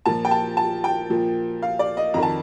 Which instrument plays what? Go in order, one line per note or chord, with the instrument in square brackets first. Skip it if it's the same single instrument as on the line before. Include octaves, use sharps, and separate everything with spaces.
[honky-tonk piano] A#2 F3 A5
G5
A5
A5
G5
A#2 F3
F5
D5
D#5
F2 A#5
D#3 A5